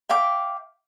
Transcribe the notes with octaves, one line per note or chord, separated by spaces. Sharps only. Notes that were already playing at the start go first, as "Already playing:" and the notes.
E5 F5 G5 D6